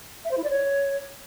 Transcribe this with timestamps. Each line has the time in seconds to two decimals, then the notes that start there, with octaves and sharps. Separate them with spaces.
0.25 E5
0.31 C5
0.37 E4
0.44 D5
0.50 C#5